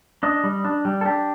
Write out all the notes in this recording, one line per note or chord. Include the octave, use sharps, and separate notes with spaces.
D4 D#5
G3
D4
G3
A4
D4 G4